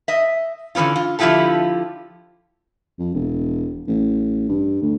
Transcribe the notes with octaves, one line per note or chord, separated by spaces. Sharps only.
D#5 E5
D3 E3 B3 C#4 F4
F4
D3 F3 E4 F4 G4 A4
F2
E1
A1
G2
D2